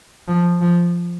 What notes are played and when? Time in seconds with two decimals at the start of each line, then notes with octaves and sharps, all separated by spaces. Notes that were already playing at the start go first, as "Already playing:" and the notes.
0.28 F3
0.61 F3